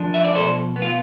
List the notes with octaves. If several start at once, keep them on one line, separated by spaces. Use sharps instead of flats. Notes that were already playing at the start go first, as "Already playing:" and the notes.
Already playing: F3 D4
E5
D5
B2 A4 C5
B3
F4